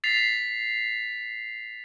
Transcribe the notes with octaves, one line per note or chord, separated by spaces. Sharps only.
A6 B6 C7 F7